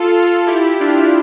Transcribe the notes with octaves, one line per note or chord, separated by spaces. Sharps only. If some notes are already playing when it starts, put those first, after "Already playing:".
Already playing: F4 A4
E4 G4
D4 F4